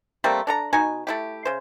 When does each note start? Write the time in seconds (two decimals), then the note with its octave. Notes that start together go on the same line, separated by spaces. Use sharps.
0.24 G3 A3 A#3 C4
0.47 D4 A4 A#5
0.73 B2 D#4 F#4 G#5
1.07 A3 E4 G4
1.45 C#3 C5